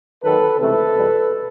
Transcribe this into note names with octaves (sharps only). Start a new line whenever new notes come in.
D#2 D#3 F#3 A4 B4
C#2 C3 E3 A3 A4 B4
E2 B2 G3